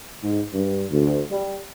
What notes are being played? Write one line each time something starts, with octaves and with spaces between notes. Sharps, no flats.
G#2
G2
D2
G3